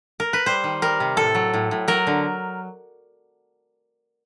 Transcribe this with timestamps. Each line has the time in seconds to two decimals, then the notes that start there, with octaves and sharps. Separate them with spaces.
0.20 A#4
0.33 B4
0.46 G3 C5
0.64 D#3
0.82 G3 A#4
1.00 C3
1.17 A2 A4
1.35 F#3
1.54 A2
1.71 A2
1.88 F#3 A#4
2.07 D3